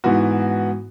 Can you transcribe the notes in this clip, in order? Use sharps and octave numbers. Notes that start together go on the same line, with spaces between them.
G#2 E3 B3 F#4